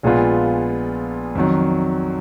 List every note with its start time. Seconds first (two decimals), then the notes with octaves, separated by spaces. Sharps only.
0.03 A#1 A#2 G#3 B3 F4
1.35 F2 D#3 F#3